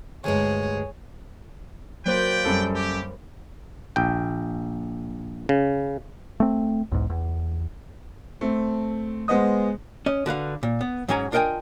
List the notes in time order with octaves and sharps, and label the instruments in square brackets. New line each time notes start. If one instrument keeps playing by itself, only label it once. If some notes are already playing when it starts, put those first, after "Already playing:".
[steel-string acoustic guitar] D2 G2 G#3 [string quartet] G#4 C#5
[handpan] F#3 A#3 C5 [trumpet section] B4 D5 G5
[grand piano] F#2 G3 A4
[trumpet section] G4
[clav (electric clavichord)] A#1 G5
C#3
[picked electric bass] A3 C4
B1 E2 G#2
E2
[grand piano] A3 C4
G#3 B3 C5 D#5 D#6
[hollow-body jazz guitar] C#4 D#5
D3 F#4 B4 F5
A#2
B3
G#2 F#3 G#3 C#4 G#5 A#5
D4 F4 A#4 D#5 G5 G#5